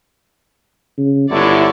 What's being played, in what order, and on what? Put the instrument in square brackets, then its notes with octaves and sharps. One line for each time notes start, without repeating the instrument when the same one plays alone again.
[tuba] C#3
[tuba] G1 [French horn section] G#2 D3 E4 [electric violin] C#5 D5